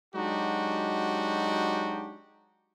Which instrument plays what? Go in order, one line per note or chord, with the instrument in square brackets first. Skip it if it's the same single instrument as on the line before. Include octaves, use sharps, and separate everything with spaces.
[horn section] F#3 G#3 D4 D#4 F#4 G4